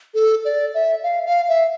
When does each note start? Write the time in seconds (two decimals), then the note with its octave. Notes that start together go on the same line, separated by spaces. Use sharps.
0.14 A4
0.45 D5
0.74 E5
1.03 F5
1.26 F5
1.48 E5